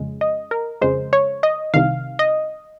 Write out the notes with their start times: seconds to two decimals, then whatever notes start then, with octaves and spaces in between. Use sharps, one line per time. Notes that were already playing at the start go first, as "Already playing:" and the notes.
Already playing: F2 C#3 G#3
0.21 D#5
0.51 A#4
0.82 F2 C#3 G#3 C5
1.13 C#5
1.43 D#5
1.74 C2 C3 D#3 F5
2.19 D#5